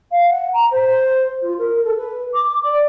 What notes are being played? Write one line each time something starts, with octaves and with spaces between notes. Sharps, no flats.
F5
F#5
A#5
C5
F4
A#4
A4
B4
D6
D5